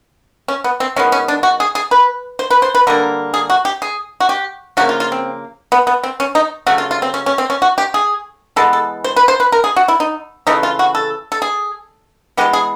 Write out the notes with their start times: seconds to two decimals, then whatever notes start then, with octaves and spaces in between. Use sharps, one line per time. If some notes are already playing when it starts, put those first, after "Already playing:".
0.48 C#4
0.64 B3
0.80 C4
0.96 D#3 G#3 B3 C#4
1.12 C#4
1.28 D4
1.43 F#4
1.60 G#4
1.75 G#4
1.91 B4
2.39 C5
2.50 B4
2.62 C5
2.75 B4
2.87 D3 G3 A#3 A#4
3.34 G#4
3.50 F#4
3.65 G4
3.82 G#4
4.20 F#4
4.29 G4
4.77 C#3 F3 A#3 F#4
4.89 F4
5.00 F4
5.12 C4
5.72 B3
5.87 B3
6.03 C4
6.20 C#4
6.35 D#4
6.67 C#3 F#3 A3 F#4
6.78 F4
6.91 F4
7.02 C4
7.14 C#4
7.26 C#4
7.38 C4
7.50 C#4
7.62 F#4
7.78 G4
7.94 G#4
8.56 E3 G#3 B3 A4
8.73 A4
9.04 C5
9.16 B4
9.28 C5
9.40 B4
9.52 A#4
9.64 G#4
9.76 F#4
9.88 E4
10.00 D#4
10.47 C#3 E3 A3 D#4
10.63 F4
10.79 F#4
10.95 A4
11.32 A4
11.42 G#4
12.37 E3 G#3 B3 G4
12.53 G#4